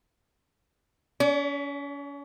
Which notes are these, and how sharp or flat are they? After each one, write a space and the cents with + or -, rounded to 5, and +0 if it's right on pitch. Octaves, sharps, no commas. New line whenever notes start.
C#4 +35 D5 -25